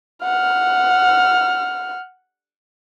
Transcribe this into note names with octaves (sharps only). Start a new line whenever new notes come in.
F#5 F6